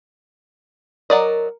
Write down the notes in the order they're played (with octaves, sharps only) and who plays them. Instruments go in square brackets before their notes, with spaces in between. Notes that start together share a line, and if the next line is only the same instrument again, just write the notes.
[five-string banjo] F#3 D5 D#5 [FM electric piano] A#4